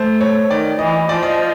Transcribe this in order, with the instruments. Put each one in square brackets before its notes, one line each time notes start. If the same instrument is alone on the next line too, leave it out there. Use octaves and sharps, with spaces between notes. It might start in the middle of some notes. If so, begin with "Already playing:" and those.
Already playing: [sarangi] A3 [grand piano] C5
[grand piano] C#5
[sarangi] D#3 [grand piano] D5
[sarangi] E3 [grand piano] D#5
[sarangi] F3 [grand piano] D5
[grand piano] D#5